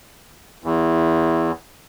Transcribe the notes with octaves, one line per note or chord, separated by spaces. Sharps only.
E2 E4